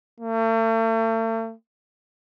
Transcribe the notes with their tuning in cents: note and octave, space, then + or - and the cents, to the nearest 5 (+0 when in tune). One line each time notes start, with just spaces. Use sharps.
A3 +40